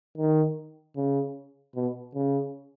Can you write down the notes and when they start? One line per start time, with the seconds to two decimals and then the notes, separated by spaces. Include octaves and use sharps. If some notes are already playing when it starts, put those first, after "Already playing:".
0.18 D#3
0.96 C#3
1.75 B2
2.15 C#3